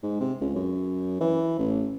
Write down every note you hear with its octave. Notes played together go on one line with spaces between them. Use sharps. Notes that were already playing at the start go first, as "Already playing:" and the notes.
G#2
C3
C#2
F#2
E3
A1